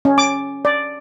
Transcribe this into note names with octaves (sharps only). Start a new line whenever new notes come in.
C#4
D6
D5